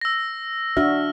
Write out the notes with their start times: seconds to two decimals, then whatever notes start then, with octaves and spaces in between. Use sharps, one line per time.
0.01 E6 A#6
0.77 D4 F#4 E5 F6